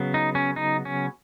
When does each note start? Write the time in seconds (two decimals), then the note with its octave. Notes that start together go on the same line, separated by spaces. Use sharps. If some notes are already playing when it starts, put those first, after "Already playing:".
Already playing: C#3 F#3 B3
0.14 D#4
0.35 C#4
0.56 D#4
0.85 C#4